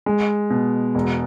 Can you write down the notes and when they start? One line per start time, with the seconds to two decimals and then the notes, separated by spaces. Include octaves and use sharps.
0.06 G#3
0.50 B2
0.95 E1